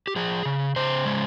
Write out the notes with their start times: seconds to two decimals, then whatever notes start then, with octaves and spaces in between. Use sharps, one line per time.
0.07 G4
0.16 F3 G#4
0.45 C#3
0.76 C#3 C5
1.06 G#3